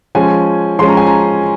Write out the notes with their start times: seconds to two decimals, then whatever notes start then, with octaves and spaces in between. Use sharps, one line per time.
0.15 F3 G#3 C#4 G#5
0.79 F3 G#3 C#4 C6
0.88 A#5
0.97 G#5
1.07 A#5